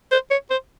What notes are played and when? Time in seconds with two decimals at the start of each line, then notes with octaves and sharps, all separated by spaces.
0.12 C5
0.31 C#5
0.50 C5